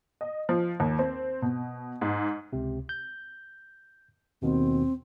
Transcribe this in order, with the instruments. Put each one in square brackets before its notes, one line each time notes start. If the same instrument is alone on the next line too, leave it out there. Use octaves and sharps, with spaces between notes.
[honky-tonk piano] D#5
F3
D#2
C4
B2
G#2
[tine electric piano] C#2 C3
G6
[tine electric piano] D#2 B2 D#3 [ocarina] C4